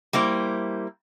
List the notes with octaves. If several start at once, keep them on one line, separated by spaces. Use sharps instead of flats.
G3 A#3 E4 C5